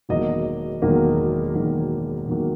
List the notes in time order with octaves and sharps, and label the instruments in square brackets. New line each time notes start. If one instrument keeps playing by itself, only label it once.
[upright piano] E1 E2 D#3 F#3 A#3 D#5
E1 E2 D#3 F#3 A#3
E1 E2 D#3 F#3 A#3
E1 E2 D#3 F#3 A#3